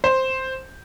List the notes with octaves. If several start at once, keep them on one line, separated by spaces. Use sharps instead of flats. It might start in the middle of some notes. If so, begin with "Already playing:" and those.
C5